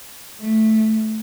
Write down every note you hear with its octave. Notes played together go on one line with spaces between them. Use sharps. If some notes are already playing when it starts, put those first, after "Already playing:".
A3